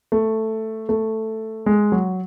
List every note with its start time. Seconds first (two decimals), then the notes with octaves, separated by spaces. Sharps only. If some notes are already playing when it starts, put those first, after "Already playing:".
0.12 A3
0.89 A3
1.66 G#3
1.92 F#3